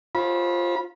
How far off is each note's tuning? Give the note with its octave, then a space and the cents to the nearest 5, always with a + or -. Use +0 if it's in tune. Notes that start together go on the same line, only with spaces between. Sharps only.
F4 +0 C5 +30 B5 -25